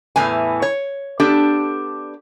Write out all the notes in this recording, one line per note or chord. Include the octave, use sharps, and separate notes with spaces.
E2 A2 E3 G#5
C#5
B3 D4 G4 A4